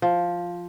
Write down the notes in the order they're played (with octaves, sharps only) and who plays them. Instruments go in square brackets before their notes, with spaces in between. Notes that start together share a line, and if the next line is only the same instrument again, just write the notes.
[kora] F3